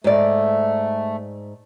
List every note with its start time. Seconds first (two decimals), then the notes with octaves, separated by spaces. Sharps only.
0.04 G#2 A3 D5